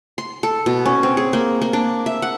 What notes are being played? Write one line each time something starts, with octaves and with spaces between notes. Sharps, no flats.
C6
A4
B2
C#4
C4
G#4
A#3
A#3
D4
E5
F#5